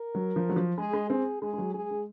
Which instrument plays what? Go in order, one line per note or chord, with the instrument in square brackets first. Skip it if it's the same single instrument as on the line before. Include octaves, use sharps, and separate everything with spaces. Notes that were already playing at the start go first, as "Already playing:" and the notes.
Already playing: [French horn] A#4
[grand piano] F#3
F3
F#3
F3
[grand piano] G#3 [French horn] G#4
[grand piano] G#3
[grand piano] C4 [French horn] G#4
[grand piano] G#3 [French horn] G#4
[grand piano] G#3
F#3
[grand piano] G#3 [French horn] G#4
[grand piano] G#3